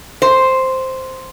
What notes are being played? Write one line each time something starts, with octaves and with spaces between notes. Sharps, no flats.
C5